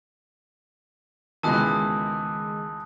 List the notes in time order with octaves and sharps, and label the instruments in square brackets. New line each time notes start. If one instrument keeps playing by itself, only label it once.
[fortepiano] C#2 B2 E3 [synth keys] D#3 G#3 [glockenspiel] A5 D#6 F#6